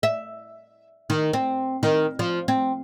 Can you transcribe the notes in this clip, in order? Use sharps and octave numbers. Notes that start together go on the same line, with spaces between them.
E5
D#3
C4
D#3
F3
C4